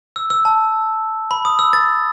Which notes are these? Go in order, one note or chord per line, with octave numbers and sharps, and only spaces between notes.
E6
E6
A5
B5
D#6
E6
A6